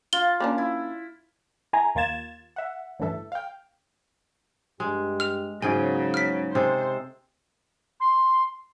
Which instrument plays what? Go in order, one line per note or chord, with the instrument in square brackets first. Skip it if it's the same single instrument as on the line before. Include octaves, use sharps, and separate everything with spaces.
[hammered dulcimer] F4 [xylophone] G7
[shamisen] A#3 C#4 D4
[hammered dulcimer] E4
[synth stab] E4 G#4 G#5 A#5
D#2 A#3 F4 G#6 A6 E7
E5 F#5
A1 D2 G2 E3 A4 E5
F5 G5
[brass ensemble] G2 G4 [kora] G#3
[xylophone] F6 F7
[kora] G#2 G#4 G5 [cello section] C#3 B3 [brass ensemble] F#3 [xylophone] G#5
[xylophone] F6 B6
[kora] C3 G#3 A4 [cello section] C5
[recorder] C6